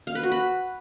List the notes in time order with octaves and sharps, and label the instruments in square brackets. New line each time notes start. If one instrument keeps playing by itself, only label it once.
[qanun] F5
B4
F#4
B5